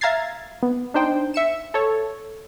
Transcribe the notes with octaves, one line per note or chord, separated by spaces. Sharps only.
E5 F5 A#5 G#6 A6 C7
B3
D4 D#4 C5 G5
E5 C#7 E7
A4 C#5